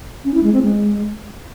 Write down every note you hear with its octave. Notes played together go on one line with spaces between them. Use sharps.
C#4
E4
G#3
C4
G#3